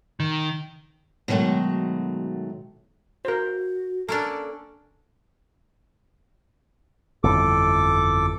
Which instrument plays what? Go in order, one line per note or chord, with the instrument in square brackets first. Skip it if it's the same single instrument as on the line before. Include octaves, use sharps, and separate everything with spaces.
[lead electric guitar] D#3
[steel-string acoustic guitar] B2 D#3 F#3 G#3 A3
[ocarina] F#4 [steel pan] A#4 C5
[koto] A#3 C#4 D4 [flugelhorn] A4
[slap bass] G1 F2 E3 [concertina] A4 D6